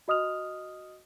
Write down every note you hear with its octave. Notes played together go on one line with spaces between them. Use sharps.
F#4 D#5 D#6 F6 F7